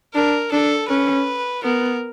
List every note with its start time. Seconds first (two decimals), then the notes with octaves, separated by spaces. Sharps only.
0.14 D4 A#4
0.51 D4 A4
0.89 C#4 B4
1.63 B3 A#4